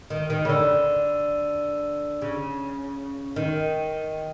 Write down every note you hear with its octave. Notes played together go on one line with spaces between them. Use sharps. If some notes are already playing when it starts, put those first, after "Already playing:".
D#3
D#3
C#3
D3
C#3
D#3